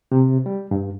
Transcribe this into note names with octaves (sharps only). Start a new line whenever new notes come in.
C3
G3
G2